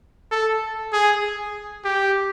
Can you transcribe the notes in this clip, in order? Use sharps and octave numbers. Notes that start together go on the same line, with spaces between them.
A4
G#4
G4